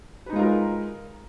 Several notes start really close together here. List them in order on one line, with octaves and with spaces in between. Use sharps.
B4 D#4 G#3 F4 A#4